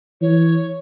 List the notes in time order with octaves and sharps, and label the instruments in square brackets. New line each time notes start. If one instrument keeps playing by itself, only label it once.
[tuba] E3 [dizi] C#5